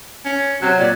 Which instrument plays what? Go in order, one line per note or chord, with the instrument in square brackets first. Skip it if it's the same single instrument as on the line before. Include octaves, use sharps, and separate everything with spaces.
[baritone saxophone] C#4 [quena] G#6
[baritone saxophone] C3 [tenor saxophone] F#3
[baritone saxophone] A#2 [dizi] D5